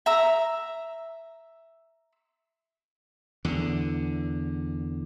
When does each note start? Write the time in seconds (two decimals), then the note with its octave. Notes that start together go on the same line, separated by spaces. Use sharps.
0.06 E5 A#5 E6
3.45 E2 D3